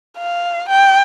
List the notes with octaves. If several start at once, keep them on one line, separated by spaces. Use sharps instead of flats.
F5
G5